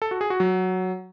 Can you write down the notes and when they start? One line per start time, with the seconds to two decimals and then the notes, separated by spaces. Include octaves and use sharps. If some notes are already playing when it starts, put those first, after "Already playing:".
0.02 A4
0.11 F#4
0.21 G#4
0.30 F#4
0.40 F#3